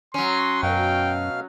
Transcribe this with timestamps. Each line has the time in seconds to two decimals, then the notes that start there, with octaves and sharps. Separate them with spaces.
0.14 F#3 C#4 C6
0.63 F#2 B2 F5 G5 F6